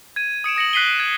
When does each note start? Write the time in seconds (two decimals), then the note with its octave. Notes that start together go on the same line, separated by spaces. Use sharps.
0.16 G#6 D#7
0.44 D#6 C#7 D7 E7
0.56 D#6 A#6 C#7 F#7
0.73 F#6 B6 C7 D#7 G7
0.87 D#7
1.00 G#6 E7